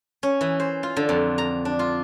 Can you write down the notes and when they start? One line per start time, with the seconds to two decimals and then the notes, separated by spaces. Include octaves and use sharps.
0.23 C#4
0.41 E3
0.60 C5
0.83 F4
0.97 D3
1.09 F2
1.38 A#5
1.65 D4
1.79 F4